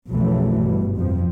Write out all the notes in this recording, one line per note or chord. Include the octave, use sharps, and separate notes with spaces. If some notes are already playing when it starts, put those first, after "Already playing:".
B1 F2 C#3 E3 F#3 A3
G1 G2 B2
F2 F3